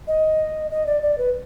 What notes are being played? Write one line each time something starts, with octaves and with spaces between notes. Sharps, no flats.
D#5
D#5
D5
D5
B4